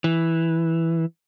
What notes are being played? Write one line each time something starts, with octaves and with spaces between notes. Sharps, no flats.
E3